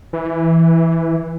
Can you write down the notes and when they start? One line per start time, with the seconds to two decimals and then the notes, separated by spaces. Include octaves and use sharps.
0.13 E3